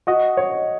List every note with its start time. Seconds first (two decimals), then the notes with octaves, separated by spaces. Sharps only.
0.07 F#4 D#5
0.37 C#5